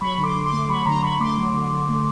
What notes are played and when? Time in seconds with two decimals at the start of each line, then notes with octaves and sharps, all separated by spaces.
0.01 F#3 B5 C#6
0.18 D3
0.23 C6 D6
0.35 D3
0.46 C6 D6
0.53 A3
0.69 F#3 B5 C#6
0.86 D3 A#5 C6
1.03 D3 B5 C#6
1.20 A3 C6 D6
1.38 F#3
1.54 D3
1.72 D3
1.89 A3